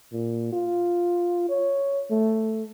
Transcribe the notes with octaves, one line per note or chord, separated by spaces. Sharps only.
A#2
F4
C#5
A3